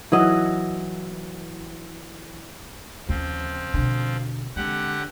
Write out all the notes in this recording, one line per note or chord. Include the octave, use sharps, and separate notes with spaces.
E3 F#3 D#5
D#2 C#3 F3 C4
B2 D3
D3 G#3 C4 G4 F#5